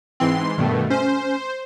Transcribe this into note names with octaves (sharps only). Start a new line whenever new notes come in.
G#2 E3 C4 C6
G2 B2 D#3 A3
C#4 C5